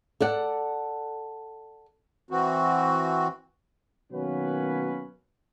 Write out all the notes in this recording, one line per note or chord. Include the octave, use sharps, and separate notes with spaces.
A4 D5 F#5
E3 C4 F#4
B2 D#3 F#3 A#3 C#4 B4